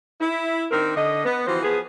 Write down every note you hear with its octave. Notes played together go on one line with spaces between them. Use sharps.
E4
D#3 C4 D4 A#4
D3 D#5
B3
E3 F3 C4 F#4 C5
F3 B3 G#4